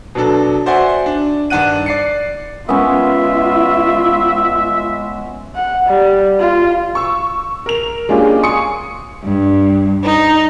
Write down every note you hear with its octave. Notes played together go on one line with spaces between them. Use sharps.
B2 F#3 D4 A4
F#4 C5 D5 E5 F#5 G#5
D4
G2 D#3 D4 F#5 F#6 D#7
D5 C7 C#7
G#3 B3 C#4 F4 E5
F#5
G3
F4
C#6 E6
A#4 F7
G#3 A#3 C#4 D4 F4 G4
G#5 C6 C#6 D#6 C#7
G2
D#4